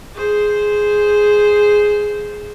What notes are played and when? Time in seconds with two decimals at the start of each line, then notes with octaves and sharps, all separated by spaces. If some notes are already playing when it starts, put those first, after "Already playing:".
0.15 G#4 C5